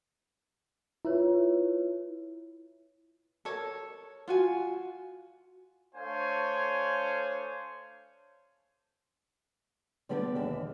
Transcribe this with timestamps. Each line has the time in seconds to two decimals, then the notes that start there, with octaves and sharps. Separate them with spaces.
1.05 E4 F4 B4 C#5
3.45 A4 A#4 C#5
4.28 F4 F#4 G#5
5.95 A3 D4 C5 C#5 F5 G#5
10.09 D3 G3 B3 D4 G4 B4
10.35 D#2 E3 E5